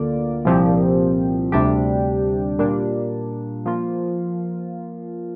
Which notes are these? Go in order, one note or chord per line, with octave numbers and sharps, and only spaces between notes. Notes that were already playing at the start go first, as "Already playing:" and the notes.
Already playing: D2 D3 A#3 F4 D5
C2 A#2 F3 C4 G4
D2 C3 G3 D4 G4
A#2 G3 A#3 D4
F3 A#3 F4